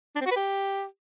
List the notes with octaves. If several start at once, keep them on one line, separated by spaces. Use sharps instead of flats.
D4
C4
F#4
B4
G4